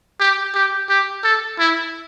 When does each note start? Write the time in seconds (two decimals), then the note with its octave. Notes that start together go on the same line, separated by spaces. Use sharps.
0.20 G4
0.55 G4
0.89 G4
1.24 A4
1.59 E4